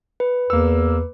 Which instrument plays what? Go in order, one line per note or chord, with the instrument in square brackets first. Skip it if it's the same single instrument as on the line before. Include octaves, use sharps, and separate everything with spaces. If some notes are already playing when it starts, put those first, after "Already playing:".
[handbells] B4
[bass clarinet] E2 [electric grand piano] A#3 E6 [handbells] B4